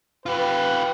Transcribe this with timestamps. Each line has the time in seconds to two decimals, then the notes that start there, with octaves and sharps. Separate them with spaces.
0.26 F4 G4 B4